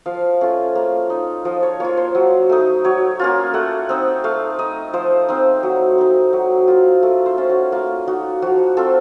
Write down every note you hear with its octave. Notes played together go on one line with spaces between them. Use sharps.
F3 F5
A3 C#4 F4
A#3
D#4
F3 D#5
C#5
A#3 F4 C#5
C5
F#3
A3 D#4
F#3 C#5
A#3 C#4 F4
A3 F#5
C4 D#4
A3 F5
D#4 D#5
F3 C5
C4 D#4
F#3
C4 D#4
F#3
A#3 F4
A3
C5
C#4 F4
F#4
A#3 F4
D#4 F#4
F3 F#4
C4 F4 A4